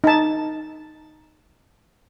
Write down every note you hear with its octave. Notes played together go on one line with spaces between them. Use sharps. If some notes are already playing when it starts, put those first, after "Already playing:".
D#4 A5